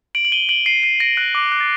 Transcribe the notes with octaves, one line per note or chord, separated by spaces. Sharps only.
D7 F#7
F#7
D#7 G7
D7 F#7
C7 D#7
C7 D#7
A#6 D7
F#6
D6
F#6
A6